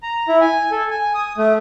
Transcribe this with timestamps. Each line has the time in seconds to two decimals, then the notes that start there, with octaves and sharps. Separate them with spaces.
0.03 A#5
0.28 E4
0.41 G#5
0.71 A4
0.90 G#5
1.15 D#6
1.38 A3